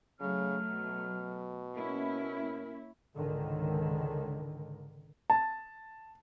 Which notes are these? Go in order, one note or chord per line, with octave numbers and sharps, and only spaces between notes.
C#3 F#3 A3 F6
B2
A#3 C#4 E4 A#4
C#2 G#2 D3 D#3
A5